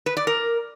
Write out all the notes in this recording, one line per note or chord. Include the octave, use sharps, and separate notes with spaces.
B4
D5
A#4